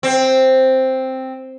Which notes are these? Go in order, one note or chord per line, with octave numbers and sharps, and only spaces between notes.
C4